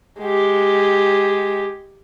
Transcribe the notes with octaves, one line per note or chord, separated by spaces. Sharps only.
G#3 G4